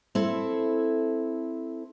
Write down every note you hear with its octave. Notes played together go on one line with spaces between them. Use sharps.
C4 E4 A4